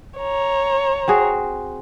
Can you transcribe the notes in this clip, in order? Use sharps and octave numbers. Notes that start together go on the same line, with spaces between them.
C#5 A#5
C4 F#4 G#4